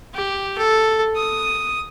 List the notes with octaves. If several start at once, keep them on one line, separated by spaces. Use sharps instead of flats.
G4
A4
D#6